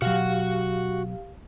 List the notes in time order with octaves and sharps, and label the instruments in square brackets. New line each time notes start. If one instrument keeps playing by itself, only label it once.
[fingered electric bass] B2 F#3 [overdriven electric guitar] F#4 F#5 [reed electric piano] G4 F5